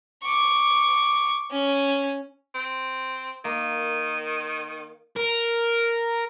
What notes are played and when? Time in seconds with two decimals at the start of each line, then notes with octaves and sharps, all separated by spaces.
0.23 C#6 D6
1.51 C#4
2.55 C4
3.45 D#3 A#3
5.16 A#4